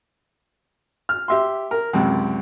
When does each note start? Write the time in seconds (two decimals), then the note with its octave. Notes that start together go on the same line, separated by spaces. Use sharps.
1.09 F6
1.28 G4 E5 C6
1.71 A#4
1.93 C#2 F#2 C3